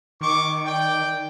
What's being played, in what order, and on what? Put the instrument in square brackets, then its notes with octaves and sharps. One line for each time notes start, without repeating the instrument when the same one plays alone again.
[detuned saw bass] D#3 [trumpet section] C#6 D6
[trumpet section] D5 G5